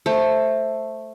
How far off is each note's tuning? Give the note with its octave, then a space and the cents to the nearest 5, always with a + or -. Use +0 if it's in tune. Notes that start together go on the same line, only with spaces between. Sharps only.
A3 +0 C5 +10